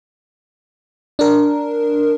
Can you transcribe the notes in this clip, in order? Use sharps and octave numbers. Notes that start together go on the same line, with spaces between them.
D4 A#4